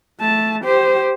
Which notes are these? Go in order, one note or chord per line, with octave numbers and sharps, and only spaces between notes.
A3 A5
G4 C5